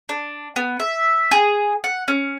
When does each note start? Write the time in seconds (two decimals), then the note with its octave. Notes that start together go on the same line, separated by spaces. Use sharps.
0.09 D4
0.56 B3
0.80 E5
1.31 G#4
1.84 F#5
2.08 C#4